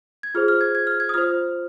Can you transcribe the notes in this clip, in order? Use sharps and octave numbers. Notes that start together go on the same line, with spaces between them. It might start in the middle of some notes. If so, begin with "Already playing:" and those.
G#6
F4 G#4 C5 F6
F6
G#6
G#6
F6
G#6
D#6
F4 C5 F6